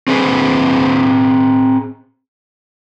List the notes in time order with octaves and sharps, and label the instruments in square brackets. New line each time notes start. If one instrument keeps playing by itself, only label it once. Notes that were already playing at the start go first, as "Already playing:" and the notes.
[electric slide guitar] C4 G#4 B4 C5